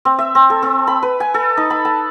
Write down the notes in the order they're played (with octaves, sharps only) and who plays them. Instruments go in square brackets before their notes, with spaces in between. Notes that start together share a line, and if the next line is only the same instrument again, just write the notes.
[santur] C4
E5
C4
A4
C4
B5
B4
G#5
A4
D#4
B5
A5